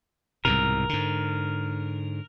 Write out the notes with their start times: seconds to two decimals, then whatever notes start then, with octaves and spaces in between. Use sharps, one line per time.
0.45 C2 G#2 B2 A#4
0.89 G#2 D3